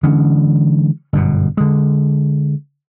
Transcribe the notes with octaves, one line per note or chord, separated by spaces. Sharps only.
D3 E3 G#3 C#4
G1 F#2 B2
D3 G#3